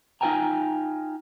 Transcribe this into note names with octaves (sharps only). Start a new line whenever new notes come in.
D#4 F4 A#4 G5 G#5 A#5